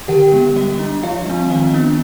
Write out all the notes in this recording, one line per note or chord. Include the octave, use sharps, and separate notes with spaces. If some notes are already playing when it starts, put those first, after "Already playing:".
D3 G4 G5
G#3 B3
G3 D#5
D4
F3 F4 F5
G#3 C4
D#3 D#5
B3 D4